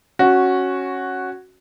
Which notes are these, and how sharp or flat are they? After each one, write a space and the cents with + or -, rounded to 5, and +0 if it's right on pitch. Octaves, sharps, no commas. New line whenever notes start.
C#4 -10 F#4 +0